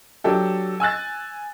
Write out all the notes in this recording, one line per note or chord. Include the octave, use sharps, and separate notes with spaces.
F#3 D4 G4 A4
G#5 E6 F#6 A6